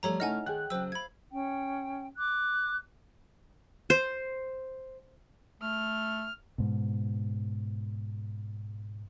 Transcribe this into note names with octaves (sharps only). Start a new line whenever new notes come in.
F3 G3 A3 A4 C#5 A#5
C#3 A3 D#4 E4 D#5 F#5 G#5 F6
D#3 G#4 G5 F#6
C#3 F#3 C5 E6
F5 B5 G#6
C#4 G5
D6 F#6
C5
A3 F6
G#2 B2